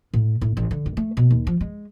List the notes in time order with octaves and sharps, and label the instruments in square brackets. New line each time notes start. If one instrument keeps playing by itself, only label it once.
[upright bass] A2
A2
A1
D3
G2
A3
B2
D#2
F3
G#3